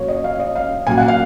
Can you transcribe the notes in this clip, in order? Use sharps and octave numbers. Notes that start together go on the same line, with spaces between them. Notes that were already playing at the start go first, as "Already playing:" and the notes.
Already playing: A#2 F#3 A#3 C#5
D#5
F5
D#5
F5
A#2 F#3 A#3 G#5
F#5
F5